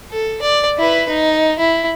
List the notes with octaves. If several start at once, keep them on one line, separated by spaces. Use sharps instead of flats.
A4
D5
E4 B4
D#4
E4